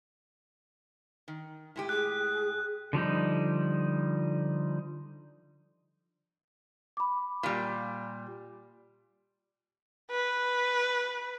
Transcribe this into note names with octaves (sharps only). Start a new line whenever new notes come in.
D#3
A2 G#3 G4
G#4 F#6
D3 F3 G3 D#4
B5 D6
A#2 G3
B4